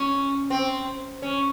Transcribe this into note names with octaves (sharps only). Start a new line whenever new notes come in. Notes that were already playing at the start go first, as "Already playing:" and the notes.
Already playing: C#4
C4
C#4